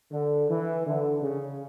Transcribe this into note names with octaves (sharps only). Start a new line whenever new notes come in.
D3
E3
D3
C#3